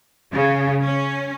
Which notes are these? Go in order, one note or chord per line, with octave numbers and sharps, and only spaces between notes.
C#3
C#4